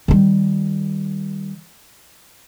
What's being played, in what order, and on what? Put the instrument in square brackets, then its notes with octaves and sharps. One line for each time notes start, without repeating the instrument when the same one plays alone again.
[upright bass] D#3 G3